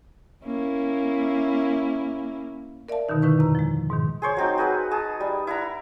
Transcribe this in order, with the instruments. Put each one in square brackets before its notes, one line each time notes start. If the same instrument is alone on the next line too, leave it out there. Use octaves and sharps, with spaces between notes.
[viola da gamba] A#3 C#4 E4
[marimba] A#4 D5 E5 F5 A5
G2 B2 D3 D#3 D#4
D3 D#3 E4 B4 C#6
F2 C3 A#5
F3 G#3
G#2 B2 D#3
[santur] G#4 C5 C#5
F#3 C4 D#4
F#4 G#4 B4 D#5
G#4 A5 D#6
G3
E4 F#5 A#5